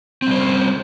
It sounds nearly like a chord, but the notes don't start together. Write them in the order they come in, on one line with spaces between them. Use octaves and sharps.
C4 G3 C5 C#4